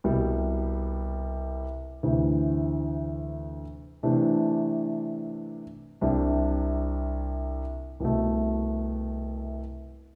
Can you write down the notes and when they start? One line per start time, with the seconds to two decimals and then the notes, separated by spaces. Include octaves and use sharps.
0.04 C2 B2 G3
2.03 D2 C3 E3
4.03 C3 E3 A3 D4
6.01 C2 C3 G3 D4
8.00 C2 B2 A3